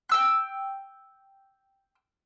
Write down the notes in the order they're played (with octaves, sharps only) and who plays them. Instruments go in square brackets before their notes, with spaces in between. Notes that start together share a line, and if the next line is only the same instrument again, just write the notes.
[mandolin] G5 E6 F#6